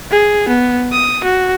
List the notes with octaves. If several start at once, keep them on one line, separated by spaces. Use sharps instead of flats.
G#4
B3
D#6
F#4